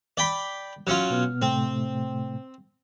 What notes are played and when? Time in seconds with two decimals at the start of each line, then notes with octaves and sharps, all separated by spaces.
0.17 D5 G5 B5
0.87 F#3 C#4 F4
1.10 B2 B3 F6
1.42 A2 C3 A3 C4